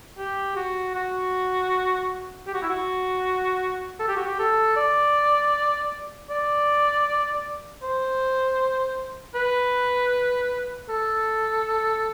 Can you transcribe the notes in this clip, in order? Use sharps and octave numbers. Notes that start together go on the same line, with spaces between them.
G4
F#4
F#4
G4
F#4
E4
F#4
A4
G4
F#4
G4
A4
D5
D5
C5
B4
A4